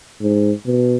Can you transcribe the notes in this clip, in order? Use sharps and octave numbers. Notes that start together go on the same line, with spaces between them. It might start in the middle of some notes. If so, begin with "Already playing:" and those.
G#2
B2